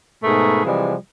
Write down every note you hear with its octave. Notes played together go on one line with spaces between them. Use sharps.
G#2 B2 A3 G#4 A#4 B4
C3 E3 F3 G3 G#3